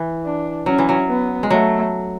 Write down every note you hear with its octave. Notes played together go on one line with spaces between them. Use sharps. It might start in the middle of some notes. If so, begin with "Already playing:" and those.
Already playing: E3
D4
F#3 C#4
E3
F#3
B3
G#3
F#3 A3